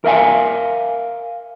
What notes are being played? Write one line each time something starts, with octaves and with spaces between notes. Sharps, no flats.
A#4 E5 F5 G#5